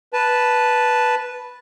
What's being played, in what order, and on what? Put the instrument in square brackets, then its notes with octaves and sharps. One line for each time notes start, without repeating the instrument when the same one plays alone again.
[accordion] B4 A5